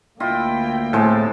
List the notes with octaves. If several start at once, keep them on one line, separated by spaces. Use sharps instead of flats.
D2 A#3 E4 F4 D#5 G5
A2 C3 G#3 A5